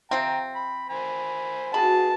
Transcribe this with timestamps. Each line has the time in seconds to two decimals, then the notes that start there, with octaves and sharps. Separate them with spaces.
0.11 C3 F3 C4 G5 A#5
0.56 B5
0.90 C5 G#5 B5
1.74 B2 F#4 G#4 A5 B5